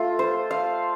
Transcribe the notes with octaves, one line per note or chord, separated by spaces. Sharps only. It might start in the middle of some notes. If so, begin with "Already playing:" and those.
Already playing: A3 F4 F5
C5
F5